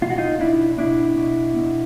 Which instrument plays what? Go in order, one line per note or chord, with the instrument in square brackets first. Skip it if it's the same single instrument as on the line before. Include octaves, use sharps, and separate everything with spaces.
[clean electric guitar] B2 F4
F#4
D#4 F4
B2 D4 E4
B2 D4 E4
B2
B2